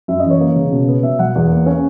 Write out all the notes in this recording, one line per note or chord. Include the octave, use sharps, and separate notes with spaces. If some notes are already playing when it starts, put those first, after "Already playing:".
F#2 E5
E3 D#5
C#5
A#3
C#3
B2
B3
B2 E5
F#3 F#5
E2
A#3
C#4